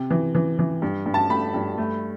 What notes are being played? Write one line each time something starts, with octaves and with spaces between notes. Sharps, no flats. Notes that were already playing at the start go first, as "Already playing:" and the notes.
Already playing: C3
E3
E3
E3
G2
G2
A5
A3 B5
G2
A3